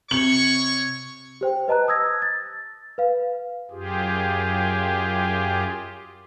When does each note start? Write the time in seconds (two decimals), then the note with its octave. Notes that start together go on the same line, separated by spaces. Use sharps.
0.11 C3 C#5 C#6 F#7
1.41 G4 C5 G5
1.68 B4 D#5 A5 A#5 F#6
1.88 D#6 E6 G#6 A#6
2.22 A6
2.98 B4 F5
3.71 F#2 F4 G4 G#4